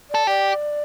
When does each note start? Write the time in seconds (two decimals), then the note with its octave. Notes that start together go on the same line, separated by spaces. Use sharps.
0.10 A4 D5
0.27 G4 D5